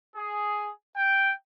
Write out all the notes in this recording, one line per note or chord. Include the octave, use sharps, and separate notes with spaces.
G#4
G5